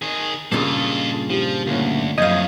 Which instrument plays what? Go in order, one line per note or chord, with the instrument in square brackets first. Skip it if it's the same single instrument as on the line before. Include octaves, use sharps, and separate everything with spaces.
[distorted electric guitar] D#3 G#4
[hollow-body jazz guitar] G2 A#2 C#3 [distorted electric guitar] F4 A4 [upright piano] D#6 A6 C7
[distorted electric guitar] F3 [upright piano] G3
[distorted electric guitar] D2 [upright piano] A#3 C#4
[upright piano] F#1 G6 G#6 [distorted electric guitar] F2 A2 [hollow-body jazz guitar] D#5 F5